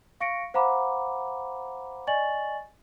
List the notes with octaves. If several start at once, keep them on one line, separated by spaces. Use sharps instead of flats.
F5 C#6 A#6 C#7 D7
C5 F5 F#5 A#5 B5 D6
D5 D#5 G#5 C#6 A6 F#7